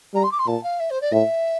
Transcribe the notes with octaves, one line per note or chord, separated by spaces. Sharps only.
G3 A#5
C6
D6
C6
A#2 A5
F5
E5
C5
D5
A2 E5